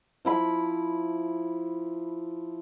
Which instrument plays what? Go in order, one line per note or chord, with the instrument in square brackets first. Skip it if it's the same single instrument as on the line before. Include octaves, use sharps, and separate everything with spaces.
[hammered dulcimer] F3 E4 B5